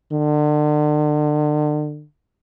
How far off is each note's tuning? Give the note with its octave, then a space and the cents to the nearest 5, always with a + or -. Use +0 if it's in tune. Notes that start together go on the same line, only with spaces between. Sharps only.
D3 +35